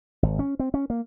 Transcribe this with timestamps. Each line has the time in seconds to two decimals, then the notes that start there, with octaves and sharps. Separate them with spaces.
0.23 G#1
0.39 C#4
0.59 C4
0.74 C#4
0.90 A#3